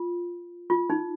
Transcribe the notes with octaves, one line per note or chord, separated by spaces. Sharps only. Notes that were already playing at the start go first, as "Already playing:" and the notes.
Already playing: F4
F4
D#4